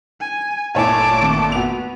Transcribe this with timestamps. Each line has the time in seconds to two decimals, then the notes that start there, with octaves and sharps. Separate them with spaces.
0.21 G#5
0.75 G1 A#2 A3 E4 C#5 G#5 A5 D6
1.21 G#1
1.52 B3 F#4 F7